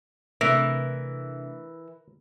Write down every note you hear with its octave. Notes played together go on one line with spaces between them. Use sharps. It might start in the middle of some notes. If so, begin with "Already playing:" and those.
C3 E3 A3 D4 A#4